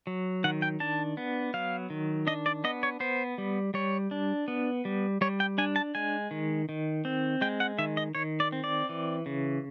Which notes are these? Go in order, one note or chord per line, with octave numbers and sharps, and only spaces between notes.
F#3
D#3 F#5
G5
D4 A5
B3
F#3 F5
D#3
D4 D#5
D5
B3 D#5
C#5
B3 C5
G3
G3 C#5
D4
B3
G3
G3 C#5
G5
D4 G#5
A5
G#3 G#5
D#3
D#3
C4
G#3 G5
F#5
D#3 E5
D#5
D#3 C#5
D5
C4
D5
E3
C#3